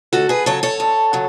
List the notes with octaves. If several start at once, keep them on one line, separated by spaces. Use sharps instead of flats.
D2 F#4 A4
G#4 B4
C#3 F#3 A4 C#5
A4 C#5
D2
C#3 F#3